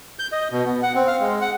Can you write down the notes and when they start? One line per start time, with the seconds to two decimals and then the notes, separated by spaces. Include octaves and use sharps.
0.19 G6
0.32 D#5
0.51 B2
0.66 B3
0.83 F#5
0.95 C4
1.07 F5
1.20 G#3
1.41 F#5